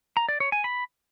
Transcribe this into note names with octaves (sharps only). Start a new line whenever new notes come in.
A#5
D5
C#5
G#5
B5